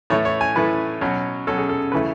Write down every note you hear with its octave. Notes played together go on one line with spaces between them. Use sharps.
A2 E3 A3 C#5
C#5
G#5
A2 E3 A3 B4
B2 F#3 C#4
B2 F#3 C#4 A4
G#4
A4
C#3 E3 A3 B4